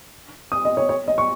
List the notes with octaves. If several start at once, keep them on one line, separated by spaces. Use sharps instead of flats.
D#6
D#5
C#5
C#5
D#5
C#6